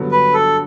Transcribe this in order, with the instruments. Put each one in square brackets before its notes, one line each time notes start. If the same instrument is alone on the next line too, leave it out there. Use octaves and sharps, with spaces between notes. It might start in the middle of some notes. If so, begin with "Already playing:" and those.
Already playing: [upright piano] G2 D3 F#3 B3 F#4
[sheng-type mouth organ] B4
A4